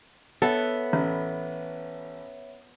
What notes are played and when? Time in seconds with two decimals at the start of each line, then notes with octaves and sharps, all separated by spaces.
0.42 B3 A4 C#5 E5
0.93 A1